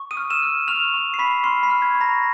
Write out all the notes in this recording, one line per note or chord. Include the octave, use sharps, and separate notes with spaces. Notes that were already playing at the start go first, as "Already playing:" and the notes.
Already playing: C#6
D#6 D#7
F6
E6 E7
F6
C#6 F6 F7
C#6
C7
B5 C#6 B6
C6 F6 C7
B5 B6
F6
G#6
C#6
A#5 A#6